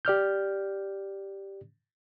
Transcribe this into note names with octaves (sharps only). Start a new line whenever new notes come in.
G4 D5 F6 G6